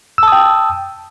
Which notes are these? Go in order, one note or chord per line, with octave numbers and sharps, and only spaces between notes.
G5 A5 D#6 E6